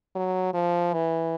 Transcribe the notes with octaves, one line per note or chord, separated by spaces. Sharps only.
F#3
F3
E3